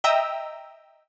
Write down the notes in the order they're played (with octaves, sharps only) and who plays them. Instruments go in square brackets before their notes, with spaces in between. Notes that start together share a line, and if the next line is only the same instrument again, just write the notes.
[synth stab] D#5 E5 G5 A#5 E6